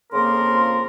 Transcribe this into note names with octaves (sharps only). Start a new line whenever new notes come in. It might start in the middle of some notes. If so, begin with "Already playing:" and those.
F2 C#3 F3 A#3 A#4 C6